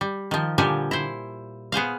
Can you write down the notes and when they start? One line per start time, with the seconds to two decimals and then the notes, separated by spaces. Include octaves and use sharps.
0.01 G3
0.31 D#3 F3
0.58 A#2 D3 F3 G3 G4 G#5
0.91 E4 C5
1.72 B3 G#4 C5 F5